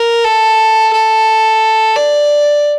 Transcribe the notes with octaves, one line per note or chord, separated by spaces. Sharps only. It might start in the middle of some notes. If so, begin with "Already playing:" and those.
Already playing: A#4
A4
A4
D5